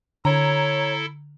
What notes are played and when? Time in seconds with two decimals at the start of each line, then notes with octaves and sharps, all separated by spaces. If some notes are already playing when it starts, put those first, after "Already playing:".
0.25 D3 E4 A4 C#5 A#5